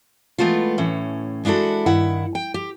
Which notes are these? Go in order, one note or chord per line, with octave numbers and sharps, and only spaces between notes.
E3 G#3 A3 B3 F4
A2 E3 C#4
G#3 D4 E4 F#4 A4
G2 D#3 E4 F#5
G5
G4